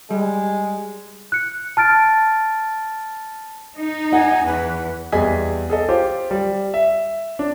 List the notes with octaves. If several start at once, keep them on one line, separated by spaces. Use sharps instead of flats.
G3 G#3
F#6 C#7
A5 F6 A6 D7
D#4
F#5 G#5
E2 B4
E2 G3 G#4 D#5 G#5 B6
G#4 A4 D#5
F4 G4 C5
G3
E5
D4